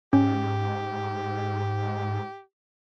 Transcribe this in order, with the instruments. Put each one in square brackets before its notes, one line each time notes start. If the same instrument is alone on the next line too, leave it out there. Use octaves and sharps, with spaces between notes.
[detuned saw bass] G#2 [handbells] C#4 [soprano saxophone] G4